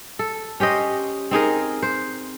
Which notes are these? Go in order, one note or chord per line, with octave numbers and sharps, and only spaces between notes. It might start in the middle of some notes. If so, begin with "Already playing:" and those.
A4
C#4 G4 C5 D#5
C4 D#4 G#4 A#4
C5